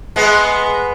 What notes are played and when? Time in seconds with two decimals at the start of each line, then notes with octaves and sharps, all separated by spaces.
0.16 G#3 B3